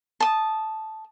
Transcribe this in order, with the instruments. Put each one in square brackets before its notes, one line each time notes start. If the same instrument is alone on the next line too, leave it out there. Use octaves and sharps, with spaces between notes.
[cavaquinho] A5 D#6